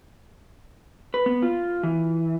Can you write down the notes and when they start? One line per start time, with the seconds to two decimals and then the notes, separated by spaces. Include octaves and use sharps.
1.14 B4
1.26 B3
1.42 F4
1.83 E3